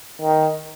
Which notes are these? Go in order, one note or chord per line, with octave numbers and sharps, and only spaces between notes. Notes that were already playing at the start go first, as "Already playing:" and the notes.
D#3